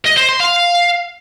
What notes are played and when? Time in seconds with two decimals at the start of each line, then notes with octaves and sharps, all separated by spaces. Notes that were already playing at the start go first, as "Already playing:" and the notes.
0.05 D#5
0.17 C5
0.29 C6
0.40 F5